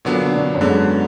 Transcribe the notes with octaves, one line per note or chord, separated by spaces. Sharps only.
A#2 D3 F#3 B3 D4
D3
B2
F#2
G#2 D3 F#3 B3